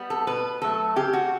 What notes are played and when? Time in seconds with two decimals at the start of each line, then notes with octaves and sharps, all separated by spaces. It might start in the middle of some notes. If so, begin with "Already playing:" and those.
Already playing: G3 B3
0.10 A4
0.27 B2 B4
0.62 F#3 A3 A4
0.96 C#3 G4
1.13 F#4